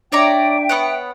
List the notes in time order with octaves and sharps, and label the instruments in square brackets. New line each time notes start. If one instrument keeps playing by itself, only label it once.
[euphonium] D4 [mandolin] C#5 D5 A#5 [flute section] E5 G5
[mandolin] B3 C#5 F#5